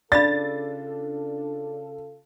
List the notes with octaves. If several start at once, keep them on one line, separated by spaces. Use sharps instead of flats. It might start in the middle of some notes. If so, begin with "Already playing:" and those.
C#3 D4 F4 A4 D5 F5 B5 A6